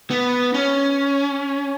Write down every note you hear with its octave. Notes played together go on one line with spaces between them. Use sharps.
B3
C#4